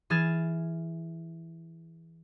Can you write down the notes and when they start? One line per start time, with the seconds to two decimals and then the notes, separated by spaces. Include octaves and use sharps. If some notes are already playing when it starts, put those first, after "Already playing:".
0.10 E3 G#4 F6 A6 E7